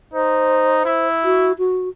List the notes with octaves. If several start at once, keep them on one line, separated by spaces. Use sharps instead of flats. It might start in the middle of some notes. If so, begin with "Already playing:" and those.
D#4 C5
E4
F#4
F#4